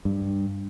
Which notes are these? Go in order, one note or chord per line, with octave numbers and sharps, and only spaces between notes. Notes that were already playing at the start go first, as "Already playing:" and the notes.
G2